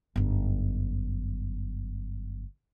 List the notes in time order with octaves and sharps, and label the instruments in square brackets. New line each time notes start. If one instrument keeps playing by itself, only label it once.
[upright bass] G1 F#2